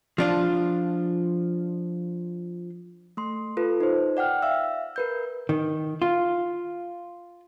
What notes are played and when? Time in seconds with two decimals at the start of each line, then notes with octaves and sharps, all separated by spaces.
0.18 F3 D4 F4
3.17 A3 C6
3.57 F4 A4 B4
3.80 D#4 C5
4.17 D5 F#5 G5 F6
4.43 E5 F5 E6
4.96 A#4 B4 G6
5.49 D#3
6.02 F4